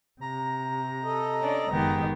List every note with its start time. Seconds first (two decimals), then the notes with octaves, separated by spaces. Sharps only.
0.21 C3 A#5
1.03 A4 D#5
1.41 C#4 D4 D5
1.69 F#1 D#3 G#3 B3 G4